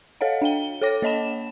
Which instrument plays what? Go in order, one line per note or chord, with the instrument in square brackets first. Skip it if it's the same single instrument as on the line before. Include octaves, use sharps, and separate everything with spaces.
[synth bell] A4 C#5 D#5 F5 F#5
D4 F5 G5 G7
A4 C#5 G5 D6 A#6
A#3 C#5 D#5 A5 B5 E7